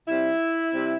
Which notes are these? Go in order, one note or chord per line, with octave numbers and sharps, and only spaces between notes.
C3 G3 C4 E4
C3 G3 C4